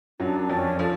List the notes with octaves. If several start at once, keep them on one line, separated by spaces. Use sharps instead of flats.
F#2 F#3 D4
F2 F3 C#4
F3 A4